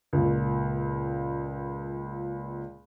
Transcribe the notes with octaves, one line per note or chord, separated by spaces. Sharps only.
C#2 A#2